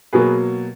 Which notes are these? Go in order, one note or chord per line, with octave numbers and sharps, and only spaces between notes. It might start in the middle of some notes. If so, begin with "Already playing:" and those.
B2 F#3 A#3 G#4 B4